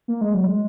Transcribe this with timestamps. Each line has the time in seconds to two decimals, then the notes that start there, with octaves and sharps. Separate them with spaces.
0.08 A#3
0.21 G#3
0.34 F#3
0.47 G#3